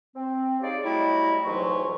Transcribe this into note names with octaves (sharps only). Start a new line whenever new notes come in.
C4
D#4 G4 G#4 C#5 D5 F5
F#3 G3 A3 E4 C#5 D#5
C2 G#2 E3 F#3 F4 C#6